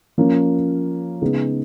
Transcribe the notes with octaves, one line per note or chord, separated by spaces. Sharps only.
F3 A#3 C#4
C#3 G#3 B3 D#4 G#4